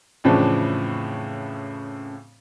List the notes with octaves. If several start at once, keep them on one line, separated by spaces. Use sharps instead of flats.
F2 A2 C#3 E3 F3 D4